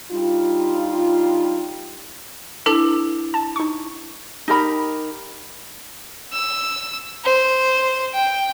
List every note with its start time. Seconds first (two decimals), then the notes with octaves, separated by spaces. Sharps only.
0.11 G3 D4 D#4 F4
2.66 D4 E4 A4 B4
3.34 A5
3.56 D#4 C#6
4.48 D#4 G4 A#4 B5
6.33 E6
7.24 C5
8.14 G5